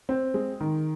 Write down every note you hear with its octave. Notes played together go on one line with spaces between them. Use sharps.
C4
G#3
D#3